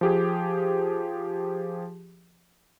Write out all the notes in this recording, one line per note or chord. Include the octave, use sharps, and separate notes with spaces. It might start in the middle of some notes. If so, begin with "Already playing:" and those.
F3 G4 G#4